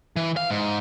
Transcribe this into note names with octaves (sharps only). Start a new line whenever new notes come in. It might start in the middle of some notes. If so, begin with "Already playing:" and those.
E3
F5
G#2